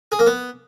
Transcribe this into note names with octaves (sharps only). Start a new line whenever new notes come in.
G#4
A#3
B3